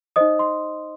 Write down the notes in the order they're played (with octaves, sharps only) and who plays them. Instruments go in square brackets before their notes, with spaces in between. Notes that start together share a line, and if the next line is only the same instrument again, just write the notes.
[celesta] D#4 C5 D#5 D#6
C6